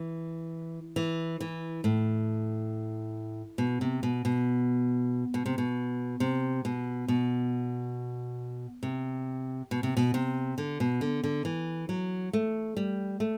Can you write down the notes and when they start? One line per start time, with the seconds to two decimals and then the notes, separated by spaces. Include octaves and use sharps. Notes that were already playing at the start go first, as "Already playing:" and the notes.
Already playing: E3
0.96 E3
1.41 E3
1.84 A2
3.58 B2
3.81 C3
4.03 B2
4.25 B2
5.34 B2
5.46 C3
5.58 B2
6.20 C3
6.65 B2
7.08 B2
8.83 C3
9.71 B2
9.83 C3
9.97 B2
10.14 C3
10.58 D3
10.80 B2
11.01 D3
11.24 D3
11.45 E3
11.89 F#3
12.33 A3
12.77 G3
13.20 A3